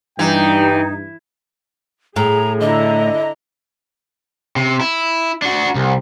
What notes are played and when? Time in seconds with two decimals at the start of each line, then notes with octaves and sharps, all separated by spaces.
0.19 G2 E3 D#4 G5
2.16 A2 G#4 A#5
2.60 D3 E4 D#5 A#5
4.56 C3
4.80 E4
5.42 D4 F#4
5.75 C2